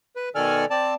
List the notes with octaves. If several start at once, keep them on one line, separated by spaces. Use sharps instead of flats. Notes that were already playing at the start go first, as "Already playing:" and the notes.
B4
B2 D#3 A4 D5 G#5 F6
C4 D5 A5